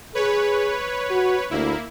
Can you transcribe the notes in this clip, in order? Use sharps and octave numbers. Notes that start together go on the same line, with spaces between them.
G#4 B4 C#5
F#4
D2 A#3 E4